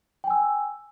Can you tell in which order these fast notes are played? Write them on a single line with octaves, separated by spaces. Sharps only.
G5 G#5 E6